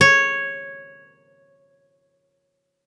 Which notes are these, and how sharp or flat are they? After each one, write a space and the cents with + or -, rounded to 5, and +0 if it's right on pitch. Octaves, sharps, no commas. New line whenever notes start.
C#5 -5